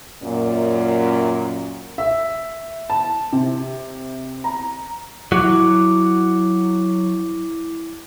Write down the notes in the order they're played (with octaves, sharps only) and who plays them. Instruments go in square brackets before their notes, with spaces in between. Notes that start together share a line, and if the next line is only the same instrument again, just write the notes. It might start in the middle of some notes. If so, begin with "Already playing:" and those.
[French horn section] F#2 A#2
[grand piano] E5
[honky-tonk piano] A5
C3
A#5
[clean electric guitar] F#3 [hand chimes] E4 D6